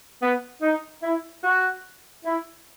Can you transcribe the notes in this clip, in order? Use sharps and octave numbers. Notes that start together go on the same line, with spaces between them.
B3
D#4
E4
F#4
E4